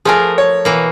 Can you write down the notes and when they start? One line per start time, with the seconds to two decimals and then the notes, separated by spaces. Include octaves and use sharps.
0.05 F3 A3 G#4 A#4 G#5
0.38 C#5
0.65 B2 E3 A#3